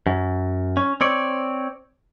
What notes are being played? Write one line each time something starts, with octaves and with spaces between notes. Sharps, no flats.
F#2
C#4
C4 C#5 D5